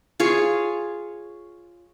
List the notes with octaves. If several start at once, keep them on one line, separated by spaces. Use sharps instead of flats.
F4 G#4 C#5